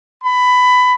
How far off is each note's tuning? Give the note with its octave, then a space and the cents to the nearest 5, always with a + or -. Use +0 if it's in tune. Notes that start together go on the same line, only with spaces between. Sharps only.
B5 +15